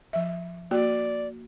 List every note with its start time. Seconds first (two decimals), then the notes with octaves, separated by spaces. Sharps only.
0.13 F3 E5
0.71 A#3 F#4 D5